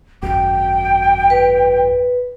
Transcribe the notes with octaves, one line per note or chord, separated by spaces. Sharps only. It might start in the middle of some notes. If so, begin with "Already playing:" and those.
G#1 F#2 G5
B4